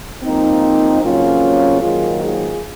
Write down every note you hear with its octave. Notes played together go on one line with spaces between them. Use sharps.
G#2 F3 A#3 C4 D#4
F2 C#3 F#3 A#3 C#4 F4
G#2 D#3 F#3 A#3 F4 G#4
F4 G#4